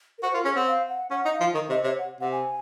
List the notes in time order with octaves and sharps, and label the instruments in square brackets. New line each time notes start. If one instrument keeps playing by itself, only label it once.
[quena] A#4
[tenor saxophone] F#4 [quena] C5
[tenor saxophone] F4 [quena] A#4
[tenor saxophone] C#4 [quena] G#4
[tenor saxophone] C4 [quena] F#5
[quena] F5
F#5
[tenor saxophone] C#4 [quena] F#5
[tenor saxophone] D#4
[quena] F5
[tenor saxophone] F3
D#3
[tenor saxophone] C3 [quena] D#5
[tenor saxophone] C3 [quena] C#5
[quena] F#5
[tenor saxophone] C3 [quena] F#5
[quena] G#5